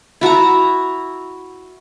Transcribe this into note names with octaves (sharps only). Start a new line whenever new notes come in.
E4 F#4 A5 A#5